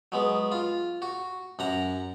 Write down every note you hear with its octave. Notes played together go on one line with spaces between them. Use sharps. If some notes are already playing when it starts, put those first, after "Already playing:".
F#3 G#3 B3
F4
F#4
F#2 F#5 A#5